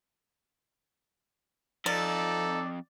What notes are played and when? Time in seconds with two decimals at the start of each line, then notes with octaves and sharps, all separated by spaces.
1.86 F2 D#4 A4 D5